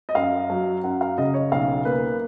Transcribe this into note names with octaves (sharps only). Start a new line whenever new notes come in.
D#5
F#2 F5
F#3
F#2 F#5
F5
C#3 D#5
C#5
B1 F5
A#3 B4